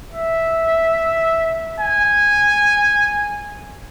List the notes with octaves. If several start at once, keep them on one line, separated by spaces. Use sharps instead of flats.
E5
G#5